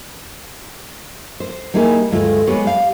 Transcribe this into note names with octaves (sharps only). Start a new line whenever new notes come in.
C5
G3 A#3 D#4 E4 G#4
D2 G2 G#3 A3 F4
G3 G#3 B3 G4 C#5
G4 F5